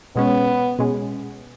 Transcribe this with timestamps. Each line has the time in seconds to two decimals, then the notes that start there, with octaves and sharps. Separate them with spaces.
0.16 B2 G#3 B3 C#4
0.79 B2 G#3 C#4